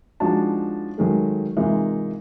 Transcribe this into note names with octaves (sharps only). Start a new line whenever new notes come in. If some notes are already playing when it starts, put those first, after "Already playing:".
F3 G#3 D4 D#4 F#4 A5
D#3 F#3 G#3 A3
C3 E3 G#3 A#3 D#4 F4